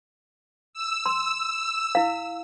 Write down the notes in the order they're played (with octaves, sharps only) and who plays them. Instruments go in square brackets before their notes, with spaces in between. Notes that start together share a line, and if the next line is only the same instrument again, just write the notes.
[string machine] E6
[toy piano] C6
E4 F5